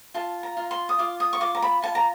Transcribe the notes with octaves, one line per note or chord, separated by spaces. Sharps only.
F4 A5
A#5
F4
C6
D#6
F4 D6
D#6
C#6
F4 D6
A#5
B5
F4 A5
A#5